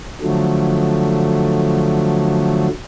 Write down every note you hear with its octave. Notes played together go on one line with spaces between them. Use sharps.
D3 F3 F#3 A3